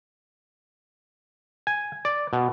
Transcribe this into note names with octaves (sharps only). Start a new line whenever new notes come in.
G#5
D5
B2